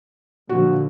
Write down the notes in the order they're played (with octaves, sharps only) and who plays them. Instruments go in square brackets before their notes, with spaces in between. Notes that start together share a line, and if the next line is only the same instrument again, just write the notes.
[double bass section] A#2 D3 F3 [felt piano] F#4